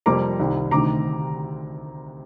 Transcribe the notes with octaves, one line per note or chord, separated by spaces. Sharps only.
F2 C3 G3 A#3 A#5 D6
C2 C3 D#3
D2 C3 D#3 A#5 D6